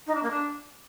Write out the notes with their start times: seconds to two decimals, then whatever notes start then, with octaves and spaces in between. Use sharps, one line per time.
0.06 D#4
0.14 D4
0.22 A#3
0.30 D4